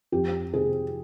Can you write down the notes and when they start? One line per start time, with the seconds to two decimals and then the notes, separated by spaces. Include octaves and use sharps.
0.12 F2 G4
0.54 C3 G#4